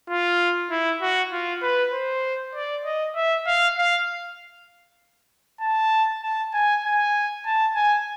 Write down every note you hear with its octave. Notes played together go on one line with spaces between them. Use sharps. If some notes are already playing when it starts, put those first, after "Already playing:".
F4
E4
F#4
F4
B4
C5
D5
D#5
E5
F5
F5
A5
A5
G#5
G#5
A5
G#5